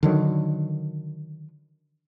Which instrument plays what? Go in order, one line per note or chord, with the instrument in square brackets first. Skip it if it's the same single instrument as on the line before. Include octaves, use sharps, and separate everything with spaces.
[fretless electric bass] D3 D#3 F#3